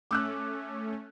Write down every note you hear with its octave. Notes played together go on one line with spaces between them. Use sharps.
A3 C#4 D6 E6 F#6